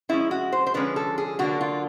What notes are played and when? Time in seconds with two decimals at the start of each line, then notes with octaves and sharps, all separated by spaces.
0.09 D3 F3 G#3 C#4 E4
0.31 F#4
0.52 C5
0.67 C5
0.74 D3 F3 G#3 C#4 B4
0.96 A4
1.18 G#4
1.39 D3 F#3 A#3 D4 F#4
1.61 F4